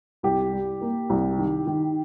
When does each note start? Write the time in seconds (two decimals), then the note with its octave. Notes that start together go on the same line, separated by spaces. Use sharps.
0.23 C2 G4
0.53 G3
0.81 A#3
1.10 C2
1.38 D#3
1.67 D#3